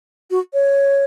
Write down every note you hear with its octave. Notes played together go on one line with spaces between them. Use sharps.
F#4
C#5